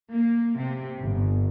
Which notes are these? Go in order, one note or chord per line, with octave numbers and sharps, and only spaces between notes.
A#3
C3
G1